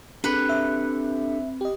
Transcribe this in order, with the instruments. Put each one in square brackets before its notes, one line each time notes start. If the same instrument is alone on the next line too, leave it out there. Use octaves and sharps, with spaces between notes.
[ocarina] C4 [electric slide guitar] D4 G4 A4 [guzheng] B4
[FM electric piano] E5
G4 D#5